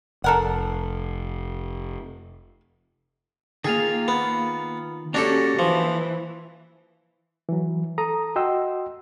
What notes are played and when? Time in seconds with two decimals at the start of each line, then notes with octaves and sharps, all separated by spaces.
0.24 F1 A4 A#4 F#5
3.64 D#3 A#3 F4 G#4 F5
4.08 B3
5.14 A#3 C#4 D4 F#4 G4 A4
5.59 E3 F3
7.49 E3 F#3
7.98 A4 A#5 D#6
8.36 F#4 D#5 F#5 G5 C6 E6